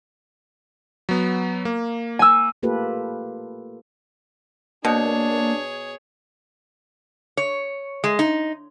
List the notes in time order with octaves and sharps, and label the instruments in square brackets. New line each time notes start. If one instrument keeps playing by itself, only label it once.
[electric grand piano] F#3 B3
A#3
[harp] G#5 E6
[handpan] A3 A#3 F4 G4 A4 B4
[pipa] B2 [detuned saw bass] A#3 [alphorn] D4 [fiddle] G#4 C#5
[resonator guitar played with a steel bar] C#5
G#3
D#4